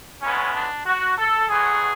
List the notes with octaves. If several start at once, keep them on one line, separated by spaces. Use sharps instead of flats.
D2 C#3 G#3 B3 C#4
D4
F#4
A4
B1 A2 F#3 B3 G#4